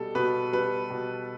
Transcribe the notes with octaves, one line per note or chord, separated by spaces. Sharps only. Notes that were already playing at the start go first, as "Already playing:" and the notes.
Already playing: B2 G3 A4
B2 B4
G3 B4
B2